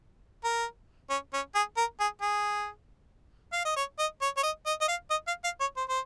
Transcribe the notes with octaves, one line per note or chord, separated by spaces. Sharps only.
A#4
C#4
C#4
G#4
A#4
G#4
G#4
F5
D#5
C#5
D#5
C#5
C#5
D#5
D#5
D#5
F5
D#5
F5
F5
C#5
C5
C5